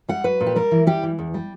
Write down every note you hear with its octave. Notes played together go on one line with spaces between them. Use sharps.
G3 F#5
F#3 B4
A#2
G4
G3 A#4
E3
G3 G4
E3
E2
G3